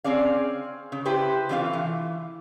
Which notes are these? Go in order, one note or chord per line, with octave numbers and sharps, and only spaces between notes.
C4 C#4 G#4 D5 F5
C#3
E4 G4 B4 C5
C3 E3 A3 F4 B4 F5
E3